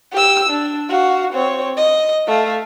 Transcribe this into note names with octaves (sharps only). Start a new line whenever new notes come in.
G4 E6
D4
F#4 F5
C4 C#5
D#5
A3 F5